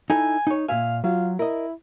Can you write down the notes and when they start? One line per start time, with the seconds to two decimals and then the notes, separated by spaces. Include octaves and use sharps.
0.10 D#4 E4 A4 G#5
0.47 D#4 C#5
0.68 A#2 E5 F5 G#5
1.04 F#3 F4
1.39 E4 A#4 D#5